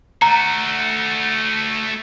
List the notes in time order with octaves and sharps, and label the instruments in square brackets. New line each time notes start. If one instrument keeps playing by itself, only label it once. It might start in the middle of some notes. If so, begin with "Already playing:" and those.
[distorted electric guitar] A3 F#4 [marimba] A#5